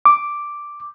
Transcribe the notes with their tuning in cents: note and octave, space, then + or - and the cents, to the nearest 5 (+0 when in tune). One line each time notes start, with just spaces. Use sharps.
D6 +0